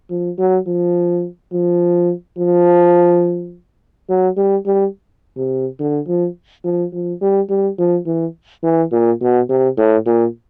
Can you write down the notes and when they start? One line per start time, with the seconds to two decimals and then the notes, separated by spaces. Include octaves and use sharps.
0.10 F3
0.38 F#3
0.67 F3
1.52 F3
2.38 F3
4.09 F#3
4.37 G3
4.66 G3
5.37 C3
5.80 D3
6.07 F3
6.65 F3
6.93 F3
7.21 G3
7.50 G3
7.79 F3
8.06 E3
8.63 E3
8.92 A#2
9.21 B2
9.49 C3
9.77 A2
10.06 A#2